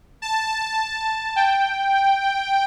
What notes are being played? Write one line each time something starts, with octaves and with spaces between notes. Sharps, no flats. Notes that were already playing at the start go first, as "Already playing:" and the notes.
A5
G5
G5
G5
G5